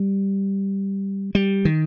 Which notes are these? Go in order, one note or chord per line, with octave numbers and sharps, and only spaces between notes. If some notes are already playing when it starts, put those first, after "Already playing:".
Already playing: G3
G3
D#3